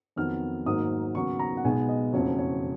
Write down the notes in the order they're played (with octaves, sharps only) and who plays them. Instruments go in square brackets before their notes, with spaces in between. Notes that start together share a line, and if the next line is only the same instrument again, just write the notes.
[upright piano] F2 D#3 F#3 B3 F6
G#1 G#2 F#3 A#3 D#6
D#2 C#3 F#3 B3 C#6
A#5
F#5
B1 B2 G#3 B3 G#5
D#5
F#1 F2 C#3 F#3 C#5
C#5